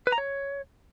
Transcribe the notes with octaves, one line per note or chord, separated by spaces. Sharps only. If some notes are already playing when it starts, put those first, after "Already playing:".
B4
A#5
C#5